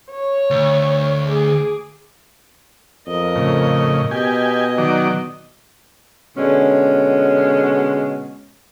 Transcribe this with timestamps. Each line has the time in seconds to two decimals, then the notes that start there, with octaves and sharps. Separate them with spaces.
0.11 C#5
0.50 D2
1.26 G#4 D6
3.07 F2 A#4 D#5
3.36 A2 C#3
4.11 B2 G4 D#5 G#5
4.78 D#3 F#3 D5
6.37 B2 D3 G#3 C#4